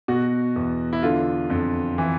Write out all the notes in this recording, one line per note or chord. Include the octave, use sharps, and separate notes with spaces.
B2 F#4
E2
E4
D3 F4
F2
E3